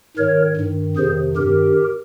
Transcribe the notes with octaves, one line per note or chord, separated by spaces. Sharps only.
G#2 D#3 A#4 C#5
G2 D#3
F2 C3 D#3 G#4 C5
G2 D#3 G4 A#4